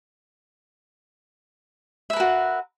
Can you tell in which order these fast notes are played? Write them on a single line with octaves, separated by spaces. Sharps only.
E5 B4 A#4 F#4